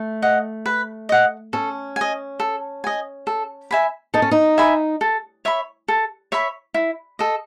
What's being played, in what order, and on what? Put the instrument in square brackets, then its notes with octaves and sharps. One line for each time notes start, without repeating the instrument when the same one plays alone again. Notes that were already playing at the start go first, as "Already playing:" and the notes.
Already playing: [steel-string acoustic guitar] A3
[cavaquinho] D#5 F#5
B4
D#5 F#5
[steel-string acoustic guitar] C#4 [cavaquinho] A4
[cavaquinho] D#5 G#5
A4
D#5 G#5
A4
E5 G#5 B5
[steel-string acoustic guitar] D#4 [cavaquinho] A4
[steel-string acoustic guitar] C#4
D#4
[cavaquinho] E5 G#5 B5
A4
C#5 E5 B5
A4
C#5 E5 B5
E4
A4 D#5